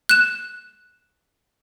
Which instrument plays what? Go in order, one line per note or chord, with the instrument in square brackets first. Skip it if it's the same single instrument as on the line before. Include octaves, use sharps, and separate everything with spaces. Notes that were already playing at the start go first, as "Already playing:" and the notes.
[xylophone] F#6 E7